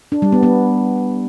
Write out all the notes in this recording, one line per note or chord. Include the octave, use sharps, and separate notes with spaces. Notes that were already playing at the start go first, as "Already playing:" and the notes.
D4
G3
B3
B3